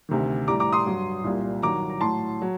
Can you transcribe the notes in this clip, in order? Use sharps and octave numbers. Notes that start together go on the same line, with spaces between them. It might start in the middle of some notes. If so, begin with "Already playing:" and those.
D2 C3 D#3
A2 G3 A#5 D6
A#5 D6
C6 D#6
G2 F#3
C2 A#2 G3
G2 D#3 F#3 A#5 D6
A#5
A2 F#3 A5 C6
F#3